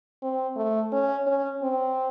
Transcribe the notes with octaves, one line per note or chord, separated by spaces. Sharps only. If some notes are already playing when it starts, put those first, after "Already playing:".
C4
A3
C#4
C#4
C4